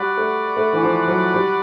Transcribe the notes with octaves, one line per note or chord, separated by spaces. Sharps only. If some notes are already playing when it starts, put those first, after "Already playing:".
Already playing: G3 F#4 B4 D5 F#5
A3
A3
E3
F3
F#3
G3